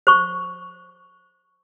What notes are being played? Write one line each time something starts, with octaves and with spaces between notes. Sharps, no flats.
C5 C#6